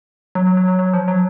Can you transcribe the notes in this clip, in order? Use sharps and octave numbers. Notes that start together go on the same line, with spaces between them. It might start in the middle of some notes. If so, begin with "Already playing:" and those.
F#3
F#3
F#3
F#3
F#3
F3
F#3